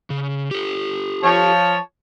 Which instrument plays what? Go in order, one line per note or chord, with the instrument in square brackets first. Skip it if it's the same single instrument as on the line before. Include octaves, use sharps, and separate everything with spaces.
[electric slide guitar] C#3
G4 A4
[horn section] F3 C#5 A5